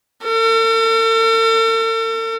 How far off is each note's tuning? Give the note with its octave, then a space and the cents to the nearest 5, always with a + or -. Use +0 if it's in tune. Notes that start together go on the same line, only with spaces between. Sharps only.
A4 +45